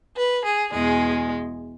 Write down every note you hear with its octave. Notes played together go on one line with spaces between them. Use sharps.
B4
G#4
E2 B2 G#3 G#4